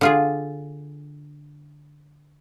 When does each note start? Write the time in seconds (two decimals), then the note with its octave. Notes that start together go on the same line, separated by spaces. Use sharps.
0.01 D3 F4 G#4